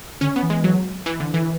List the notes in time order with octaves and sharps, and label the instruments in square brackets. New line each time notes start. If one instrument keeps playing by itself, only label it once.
[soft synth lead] D3 [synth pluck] C#4
[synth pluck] B3
[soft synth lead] E3
[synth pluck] G#3
F#3
E3
D3
E3